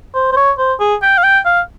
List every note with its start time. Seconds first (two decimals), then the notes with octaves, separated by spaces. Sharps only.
0.14 C5
0.32 C5
0.36 C#5
0.58 C5
0.80 G#4
1.02 G5
1.17 F5
1.23 G5
1.45 F5